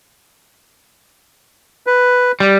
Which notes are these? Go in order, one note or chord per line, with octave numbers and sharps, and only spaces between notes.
B4
G3